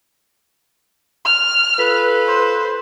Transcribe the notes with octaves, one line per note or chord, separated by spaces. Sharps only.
F6
F4 A4 B4
C5